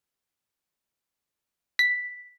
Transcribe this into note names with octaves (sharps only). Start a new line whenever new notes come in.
B6